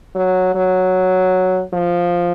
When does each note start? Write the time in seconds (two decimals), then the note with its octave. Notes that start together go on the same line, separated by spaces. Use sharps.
0.16 F#3
0.55 F#3
1.73 F3